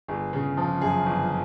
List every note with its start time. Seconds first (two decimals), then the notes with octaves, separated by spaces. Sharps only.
0.08 G1 G#4
0.33 C#3
0.57 F3
0.81 F#2 G#4
1.06 G1